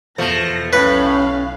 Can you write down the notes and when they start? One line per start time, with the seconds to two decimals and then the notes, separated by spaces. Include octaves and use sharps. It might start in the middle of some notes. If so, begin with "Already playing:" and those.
0.18 E2 B2 F3 A3 A#6
0.73 B1 A2 C#4 B4 F5